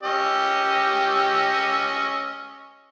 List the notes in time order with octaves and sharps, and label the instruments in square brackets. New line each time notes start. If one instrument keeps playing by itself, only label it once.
[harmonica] C#4 D#5 E6 [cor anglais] G4